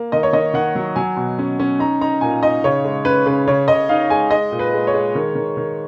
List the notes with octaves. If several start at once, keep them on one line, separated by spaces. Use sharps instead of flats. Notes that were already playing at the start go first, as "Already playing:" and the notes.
Already playing: A#3
D#3 D#5
C#5
D#3 D#5
D#3 F#5
F#3
F#3 G#5
B2
C#4
C#4
D#4 A#5
D#4 A#5
A#2 G#5
D#4 D#5
C#3 C#5
G#3
C#4 B4
C#3 B4
C#3 C#5
C#3 D#5
D#4 F5
G#3 G#5
G#3 D#5
A#2
B4
G#3
C#5
G#3
D#3
D#3
D#3